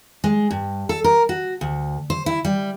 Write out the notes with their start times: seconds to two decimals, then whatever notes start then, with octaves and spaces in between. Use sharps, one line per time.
0.24 G#3
0.51 G2
0.89 A4
1.04 A#4
1.29 F#4
1.61 D2
2.10 C5
2.26 E4
2.45 G3